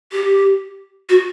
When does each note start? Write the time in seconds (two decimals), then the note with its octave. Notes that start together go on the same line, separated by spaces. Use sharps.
0.12 G4
1.09 F#4